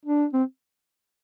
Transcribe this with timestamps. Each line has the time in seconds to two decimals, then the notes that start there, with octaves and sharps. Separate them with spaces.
0.05 D4
0.33 C4